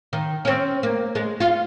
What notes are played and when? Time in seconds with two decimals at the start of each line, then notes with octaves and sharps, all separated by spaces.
0.13 D#3
0.45 C4 C#4
0.83 A#3
1.15 G#3
1.40 F4